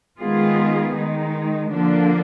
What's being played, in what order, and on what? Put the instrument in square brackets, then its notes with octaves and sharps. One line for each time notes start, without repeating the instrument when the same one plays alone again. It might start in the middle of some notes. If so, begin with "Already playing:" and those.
[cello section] D#3 G#3 B3 F4 G#4
D#3 G#3 D#4
D3 F3 A#3 D4